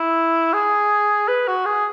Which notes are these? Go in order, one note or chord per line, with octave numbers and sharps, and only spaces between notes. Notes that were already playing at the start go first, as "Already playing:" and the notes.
Already playing: E4
G#4
B4
F#4
G#4